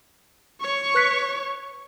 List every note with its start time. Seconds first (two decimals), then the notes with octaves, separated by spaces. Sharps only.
0.61 C#5 C#6
0.95 B4 F#6 B6